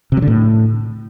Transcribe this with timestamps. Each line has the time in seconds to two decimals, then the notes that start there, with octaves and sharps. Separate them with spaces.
0.12 C3
0.17 F#3
0.22 D3
0.28 A2